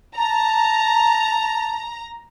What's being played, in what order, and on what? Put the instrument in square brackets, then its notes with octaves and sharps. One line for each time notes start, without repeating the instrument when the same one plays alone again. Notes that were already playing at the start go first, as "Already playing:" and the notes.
[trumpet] A5 [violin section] A#5